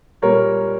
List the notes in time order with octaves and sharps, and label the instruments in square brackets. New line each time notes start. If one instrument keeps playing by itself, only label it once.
[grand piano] A#2 G3 A#3 A#4 C#5